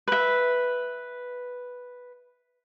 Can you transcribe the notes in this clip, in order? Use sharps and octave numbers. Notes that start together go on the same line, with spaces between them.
B4 E5